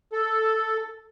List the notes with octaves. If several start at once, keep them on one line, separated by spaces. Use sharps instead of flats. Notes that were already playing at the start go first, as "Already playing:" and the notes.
A4